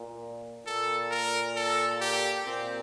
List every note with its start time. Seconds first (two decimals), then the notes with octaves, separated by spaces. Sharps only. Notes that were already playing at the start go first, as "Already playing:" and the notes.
Already playing: A#2
0.67 A#2 A4
1.11 A#4
1.56 A4
2.01 G4
2.46 A#2 C4